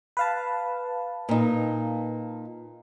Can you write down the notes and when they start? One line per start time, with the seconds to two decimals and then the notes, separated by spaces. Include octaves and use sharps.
0.17 B4 F5 A5
1.29 A#2 D#4